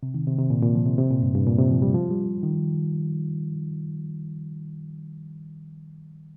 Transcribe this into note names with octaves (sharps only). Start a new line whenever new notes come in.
C3
D#3
C3
C3
A#2
A#2
F3
C3
C3
A#2
G2
G2
A#2
C3
F3
G3
F3
G3
D#3